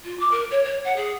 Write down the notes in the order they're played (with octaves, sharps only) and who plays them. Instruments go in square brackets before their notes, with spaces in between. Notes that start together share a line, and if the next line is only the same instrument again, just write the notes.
[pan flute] F4
D6
A#4
C#5
C#5
F#5
G#4